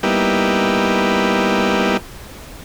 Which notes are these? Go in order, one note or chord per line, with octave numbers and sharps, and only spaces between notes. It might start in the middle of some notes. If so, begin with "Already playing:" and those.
G3 A#3 B3 D#4 E4 G4